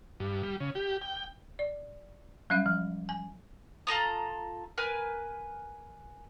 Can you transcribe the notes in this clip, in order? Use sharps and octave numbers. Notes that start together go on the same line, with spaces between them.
G2
G3
C#3
G4
G5
D5
F#3 G3 C#4 E5 F5
F3
G#5
F4 A4 A#5 D#6
A#4 B4 G#5